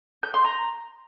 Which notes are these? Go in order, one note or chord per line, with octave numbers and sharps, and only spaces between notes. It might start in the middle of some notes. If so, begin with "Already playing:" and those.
G6
C6
A#5